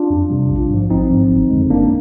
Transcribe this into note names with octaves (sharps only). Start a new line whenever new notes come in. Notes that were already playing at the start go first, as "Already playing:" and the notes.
Already playing: D4 F4
F2
C3 G3
A#1
G#2 F3
A#1 C4 D#4
G#2 F3
G1
F2 D3 G#3
G1 A#3 D4